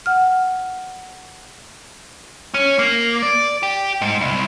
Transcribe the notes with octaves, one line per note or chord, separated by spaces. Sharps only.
F#5 F6
C#4
A#3
D5
G4
G#2
C2